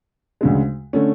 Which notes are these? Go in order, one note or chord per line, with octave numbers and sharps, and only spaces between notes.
D2 C#3 G#3
D3 A3 C#4